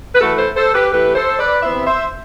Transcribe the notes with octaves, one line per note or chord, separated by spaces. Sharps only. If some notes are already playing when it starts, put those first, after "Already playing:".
B4
E3 A3 E4 F#4 A4
A4 C5
A4 C5
G4 B4
E3 A3 E4 G4 B4
A4 C5
B4 D5
C3 E3 B3 E4 C5 E5
C5 E5